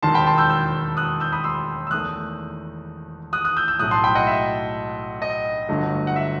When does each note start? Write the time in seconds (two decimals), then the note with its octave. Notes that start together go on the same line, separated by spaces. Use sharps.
0.02 E1 D#2 D#3 F#3 A5 C6
0.14 G5 B5
0.26 A5 C6
0.38 E6 G6
0.50 E6 G6
0.97 D#6 F#6
1.20 E6 G6
1.32 B5 D#6
1.44 C6 E6
1.87 E6
1.91 E2 D#3 A3 D#6 F#6
3.33 D#6 F#6
3.45 D#6 F#6
3.57 E6 G6
3.68 E6 G6
3.79 B1 A2 F#3 A3 D#6 F#6
3.91 A5 C6
4.04 G5 B5
4.15 D#5 F#5
4.27 E5
5.22 D#5
5.69 G1 G2 F#3 A3
6.07 F#5
6.16 E5